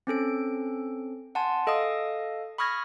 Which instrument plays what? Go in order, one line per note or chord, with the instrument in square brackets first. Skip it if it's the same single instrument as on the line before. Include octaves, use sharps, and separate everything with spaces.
[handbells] C4 C#4 A4 D7
F#5 G#5 A5 C6
A4 D#5 F5 D#6
B5 C#6 D#6 F6 G#6 A#6